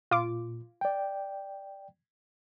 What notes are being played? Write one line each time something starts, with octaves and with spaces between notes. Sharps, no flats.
A#2 F4 D6
D5 G5